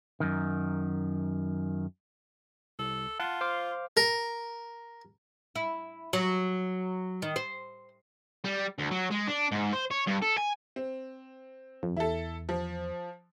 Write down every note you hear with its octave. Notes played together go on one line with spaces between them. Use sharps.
F#2 D#3
C2 A4
F4 F5 F#5 A5
C5 F5 D6
A#4
E4
F#3
D#3
C5
G3
D2
F#3
G#3
D4
G#2
C5
C#5
G2
A4
G#5
C4
F2
E2 E4 A4
F3